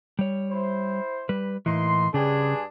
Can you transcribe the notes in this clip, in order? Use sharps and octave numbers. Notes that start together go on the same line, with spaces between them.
G3 C#5
E4 C5
G3 B4
A2 E3 A#3 D#4 C6
G2 C#3 D4 G#4 G5